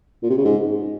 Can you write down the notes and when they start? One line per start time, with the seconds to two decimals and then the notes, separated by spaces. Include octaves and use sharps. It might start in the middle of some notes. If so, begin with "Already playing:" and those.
0.22 A#2
0.30 C3
0.37 C#3
0.44 G#2